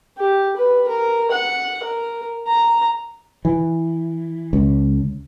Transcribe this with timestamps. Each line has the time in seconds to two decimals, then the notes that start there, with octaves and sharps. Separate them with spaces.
0.18 G4
0.56 B4
0.88 A#4
1.31 F#5
1.84 A#4
2.47 A#5
3.45 E3
4.53 C#2